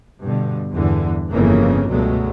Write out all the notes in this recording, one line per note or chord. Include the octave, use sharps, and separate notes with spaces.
G2 B2 D3
E2 G2 D3 E3
G1 F2 C#3 E3 A#3
C#2 G2 B2 F#3 G#3 A3